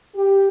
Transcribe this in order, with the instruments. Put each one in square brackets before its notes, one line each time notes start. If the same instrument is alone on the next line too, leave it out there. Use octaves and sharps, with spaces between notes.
[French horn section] G4